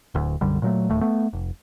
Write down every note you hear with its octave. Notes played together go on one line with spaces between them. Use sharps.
D1 D2
B1 F#2 D3 G3
A#2 F#3 A3
D1 D#2 A2 A3
A3 B3
F1